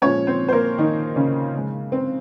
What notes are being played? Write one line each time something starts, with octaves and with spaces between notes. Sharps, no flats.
A#2 F3 G#3 C#4 C#5
C4 C5
C5
A#3 A#4
D#3 D#4
C#3 C#4
C#3 G#3
C4